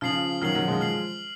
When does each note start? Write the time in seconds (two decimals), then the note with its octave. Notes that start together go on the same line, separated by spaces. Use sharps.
0.01 C#3 F3 F6 C7 F#7
0.42 D#3 F#3 F6 C7 F#7
0.55 D#3 F#3
0.68 F3 G#3
0.81 F6 C7 F#7